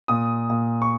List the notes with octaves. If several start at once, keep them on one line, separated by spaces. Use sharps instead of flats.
A#2 D#6
A#2
C#6